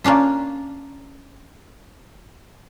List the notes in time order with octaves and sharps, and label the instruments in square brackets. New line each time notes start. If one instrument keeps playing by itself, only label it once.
[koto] A#3 C#4 D4 F4